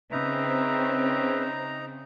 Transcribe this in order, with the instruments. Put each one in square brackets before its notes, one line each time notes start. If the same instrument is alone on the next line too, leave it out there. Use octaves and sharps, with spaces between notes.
[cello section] C#3 [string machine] C4 [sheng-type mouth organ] D#4 A#5 [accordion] B4 E5